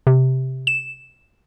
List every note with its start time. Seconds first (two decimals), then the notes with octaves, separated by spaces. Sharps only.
0.07 C3
0.67 E7